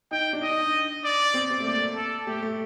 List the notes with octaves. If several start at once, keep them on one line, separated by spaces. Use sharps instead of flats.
D#4 G5
D4
D#4 D#5
D5
C4
C4
A3
A#3 D5
A4
A3 G4
A3